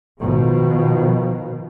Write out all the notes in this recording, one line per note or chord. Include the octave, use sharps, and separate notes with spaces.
B2 D#3 F3